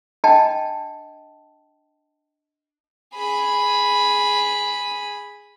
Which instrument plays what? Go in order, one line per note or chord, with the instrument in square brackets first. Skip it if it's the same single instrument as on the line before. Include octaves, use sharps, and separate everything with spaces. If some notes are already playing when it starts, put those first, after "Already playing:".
[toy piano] D4 D#5 G5 A5
[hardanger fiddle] G#4 B5